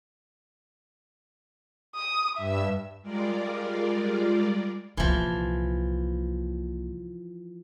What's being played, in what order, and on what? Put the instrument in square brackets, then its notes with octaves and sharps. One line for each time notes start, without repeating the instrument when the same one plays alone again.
[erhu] D#6
[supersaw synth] G2 E6 [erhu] E5
[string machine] G3 G#3 F4 A#4 D5
[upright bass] C2 A#2 [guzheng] E3 F3